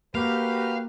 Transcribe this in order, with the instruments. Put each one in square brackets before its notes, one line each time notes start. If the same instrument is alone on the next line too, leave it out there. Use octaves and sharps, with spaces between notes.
[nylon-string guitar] A#3 [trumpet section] F#4 A#4 B4 [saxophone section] G4 [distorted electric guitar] F5